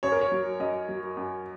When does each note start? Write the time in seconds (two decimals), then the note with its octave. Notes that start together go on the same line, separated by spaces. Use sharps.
0.03 F#2 C#5
0.12 A#4
0.21 C#5
0.32 F#3
0.60 F#2 D#5
0.89 F#3
1.17 F#2